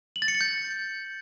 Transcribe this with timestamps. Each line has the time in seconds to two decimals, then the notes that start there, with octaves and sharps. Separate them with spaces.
0.16 F#7
0.22 A6
0.28 C#7
0.34 A6
0.41 G6